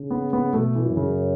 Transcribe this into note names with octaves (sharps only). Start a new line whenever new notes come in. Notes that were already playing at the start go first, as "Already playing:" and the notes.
Already playing: C#3
B3
B3
B2 A3
E3
F#2
C#3